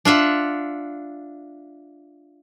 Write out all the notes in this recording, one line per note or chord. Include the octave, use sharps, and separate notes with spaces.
D4 F4 E5 F#5